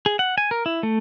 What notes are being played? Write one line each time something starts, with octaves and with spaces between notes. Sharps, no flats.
G#4
F#5
G#5
A#4
E4
A3